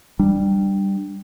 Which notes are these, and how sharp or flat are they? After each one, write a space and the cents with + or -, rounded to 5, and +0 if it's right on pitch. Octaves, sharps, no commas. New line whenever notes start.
G3 +0 D4 +15